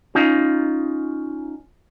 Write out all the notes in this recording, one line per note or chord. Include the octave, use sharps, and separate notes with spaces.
C#4 D#4 F4